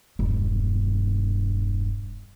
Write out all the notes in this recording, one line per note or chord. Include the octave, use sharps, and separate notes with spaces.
E1 G2